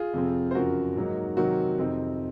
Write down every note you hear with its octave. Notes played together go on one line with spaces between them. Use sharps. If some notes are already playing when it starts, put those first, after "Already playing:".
Already playing: F4 G#4
F2 C3 F3 C4
C5
F#2 C#3 F3 F#4 A#4
G#2 F#3 A#3 D#4
C3 D#3 F#3 C4 D#4 F#4 A#4
F2 C3 F3 C4 D#4